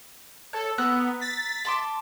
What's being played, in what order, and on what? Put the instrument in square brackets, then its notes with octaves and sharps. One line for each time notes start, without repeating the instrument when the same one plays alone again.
[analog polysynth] A4 [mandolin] C#5
[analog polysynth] B3 [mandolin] A#5 E6 F#6
[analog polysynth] A6 B6
[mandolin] A5 C6 D6